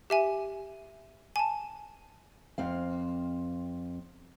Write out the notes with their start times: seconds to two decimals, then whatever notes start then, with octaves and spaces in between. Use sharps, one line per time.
0.10 G4 E5 G#5
1.36 G#5 A5
2.58 F2 C4 F5